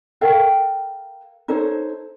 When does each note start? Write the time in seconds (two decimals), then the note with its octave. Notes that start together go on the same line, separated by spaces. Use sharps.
0.21 A4 A#4 F5 G5
1.48 D#4 A4 C5 C#5